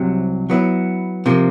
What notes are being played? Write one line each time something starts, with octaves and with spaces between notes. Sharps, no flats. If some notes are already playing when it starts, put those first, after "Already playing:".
Already playing: C2 C3 F#3
F#3 B3 E4
C3 F3 A#3